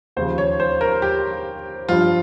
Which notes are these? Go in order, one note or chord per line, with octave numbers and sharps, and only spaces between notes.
D#2 C#3 F3 C5
C#5
C5
A#4
G4
G2 F3 F4